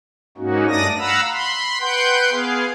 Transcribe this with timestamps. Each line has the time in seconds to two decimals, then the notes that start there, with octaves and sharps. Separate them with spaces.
0.37 G#2 A#3 C#4 D#4 F#4
0.68 G2 A3 D4 D5 D#6 A#6
0.99 F5 F#5 A#5 B5 E6
1.32 B5 C6
1.81 B4 F#5 G5 C6 G6
2.31 B3 G#4 F5